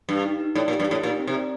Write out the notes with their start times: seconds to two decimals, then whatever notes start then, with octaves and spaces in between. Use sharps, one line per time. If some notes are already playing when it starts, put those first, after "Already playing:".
0.09 G2 G4
0.24 D#4
0.40 D#4
0.55 A2 D5
0.68 A#2
0.72 G4
0.80 G2
0.88 A2 G4
1.03 A#2 D#4
1.20 C4
1.27 C3
1.35 D5